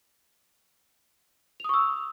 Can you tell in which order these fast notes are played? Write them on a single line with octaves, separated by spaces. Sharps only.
F7 D#6 C#6 E6